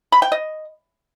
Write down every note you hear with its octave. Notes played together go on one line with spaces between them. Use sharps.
B5
G5
D#5